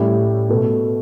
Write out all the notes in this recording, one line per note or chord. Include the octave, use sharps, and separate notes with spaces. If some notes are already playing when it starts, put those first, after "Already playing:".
Already playing: A2 G3 C#4 E4 G4
B2 A3